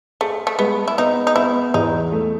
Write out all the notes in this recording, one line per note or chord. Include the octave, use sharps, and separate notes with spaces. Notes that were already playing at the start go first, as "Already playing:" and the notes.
A3 G#4
A3
G#3 B3
E4
B3 D#4
D#4
B3 E4
E2 D#4
A3